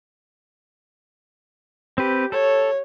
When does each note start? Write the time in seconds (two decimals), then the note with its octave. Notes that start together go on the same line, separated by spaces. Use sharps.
1.98 C4 G4 B4
2.32 A4 C#5